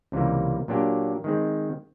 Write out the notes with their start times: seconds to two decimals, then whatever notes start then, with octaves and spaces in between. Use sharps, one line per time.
0.12 C#2 C3 E3 G3 A#3
0.68 A#2 F#3 A#3 D4 G4
1.24 D#3 G#3 C4